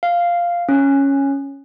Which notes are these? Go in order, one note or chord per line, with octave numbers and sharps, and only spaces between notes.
F5
C#4